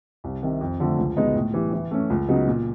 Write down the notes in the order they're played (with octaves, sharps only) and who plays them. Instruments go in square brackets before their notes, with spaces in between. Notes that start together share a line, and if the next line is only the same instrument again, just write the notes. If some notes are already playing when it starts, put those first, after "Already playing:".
[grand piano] C2
C3 D#3
F2
D3 F3 A3
C#2
B2 G#3 B3 D#4
A2
E3 G3
E3
A3 C#4
C#2
C#3 F#3 B3 D#4
A#2